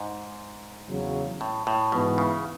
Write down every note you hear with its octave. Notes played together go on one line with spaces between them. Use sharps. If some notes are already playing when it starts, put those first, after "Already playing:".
Already playing: G#2
E2 C#3 F#3
A2
A2
G#2 B2 E3 B3
C#3